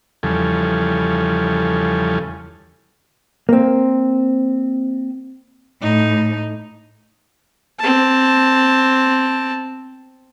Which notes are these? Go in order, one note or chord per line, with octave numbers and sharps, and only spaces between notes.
E2 C#3 F3 G3 A4 G#5
A#3 C4
A2 D#4
C4 A5